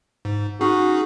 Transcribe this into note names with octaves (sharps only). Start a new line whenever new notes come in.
G#2
C#4 D#4 F#4 G#4